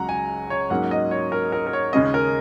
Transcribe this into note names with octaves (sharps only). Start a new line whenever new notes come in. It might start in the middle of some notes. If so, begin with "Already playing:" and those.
Already playing: C#2 C#3 F#3 F#5 A#5
G#5
C#5
G#2 F#3 A#3 C#4 F#5
D#5
C#5
A#4
A#4
A#4
C#5
D#2 C#3 G#3 C#4 D#5
A#4